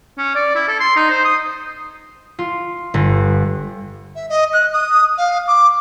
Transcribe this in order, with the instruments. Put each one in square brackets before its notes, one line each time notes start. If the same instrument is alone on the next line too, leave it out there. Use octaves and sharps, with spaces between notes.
[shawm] C#4
D5
E4
A4
C6
D#4
C5
D#6
[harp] F4
G1
[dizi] E5
D#5
F#6
D#6
F5
D6